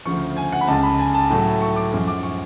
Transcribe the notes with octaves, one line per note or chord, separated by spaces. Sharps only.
D2 C#3 F3 C#6
G#5
F#5
B5
C#2 C#3 G#3 A5
B5
G#5
A5
A2 F#3 A3
C#6
D6
F#2 F3 G#3
D6
C#6